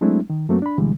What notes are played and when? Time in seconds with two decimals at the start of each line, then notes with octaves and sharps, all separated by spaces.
0.01 F#3 G#3 A3 C4 D4 E4
0.30 D#3
0.49 F#2 F#3 A3 A#3 C4 F#4
0.62 D4 B5
0.78 D2 B2 D3 E3 G3 G#3